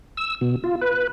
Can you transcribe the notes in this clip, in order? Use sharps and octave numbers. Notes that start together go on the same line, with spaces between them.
E6
B2
F4
B4